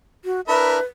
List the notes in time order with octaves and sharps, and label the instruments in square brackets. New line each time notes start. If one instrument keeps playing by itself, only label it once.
[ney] F#4
[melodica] D4 E4 B5 [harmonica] A#4 E5 [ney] B4